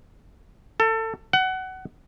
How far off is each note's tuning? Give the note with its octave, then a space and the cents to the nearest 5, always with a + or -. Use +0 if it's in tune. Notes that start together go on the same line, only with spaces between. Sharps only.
A4 +25
F#5 +20